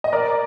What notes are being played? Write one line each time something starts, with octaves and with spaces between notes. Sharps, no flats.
D#5
A#4 D5